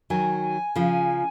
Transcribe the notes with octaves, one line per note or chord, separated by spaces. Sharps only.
D#3 F#3 G#5
C#3 F3